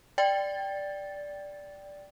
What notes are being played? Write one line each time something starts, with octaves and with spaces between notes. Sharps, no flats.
D5 G5 A6